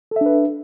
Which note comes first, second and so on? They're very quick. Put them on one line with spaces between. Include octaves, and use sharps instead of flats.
A4 E5 D4 B4